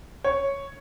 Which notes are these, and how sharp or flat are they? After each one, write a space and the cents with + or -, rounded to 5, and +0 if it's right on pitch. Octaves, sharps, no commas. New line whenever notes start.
C#5 +0